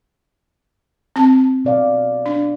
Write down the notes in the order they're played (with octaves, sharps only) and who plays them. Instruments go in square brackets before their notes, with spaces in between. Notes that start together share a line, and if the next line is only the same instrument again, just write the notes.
[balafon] C4 A5
[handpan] B2 D5 F5
[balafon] D4